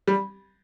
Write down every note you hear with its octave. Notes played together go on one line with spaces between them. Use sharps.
G3